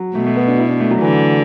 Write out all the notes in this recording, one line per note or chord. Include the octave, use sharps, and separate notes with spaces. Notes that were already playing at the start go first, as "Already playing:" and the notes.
Already playing: F#3
B2 A3
A3
B3
D4
E4
D4
A3
F#3
D3 E3